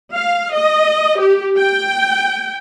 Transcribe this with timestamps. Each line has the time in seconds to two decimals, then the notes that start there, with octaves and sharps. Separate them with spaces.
0.14 F5
0.54 D#5
1.19 G4
1.59 G5